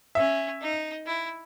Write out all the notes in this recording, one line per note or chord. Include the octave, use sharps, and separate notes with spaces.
C#4 E5
D#4
E4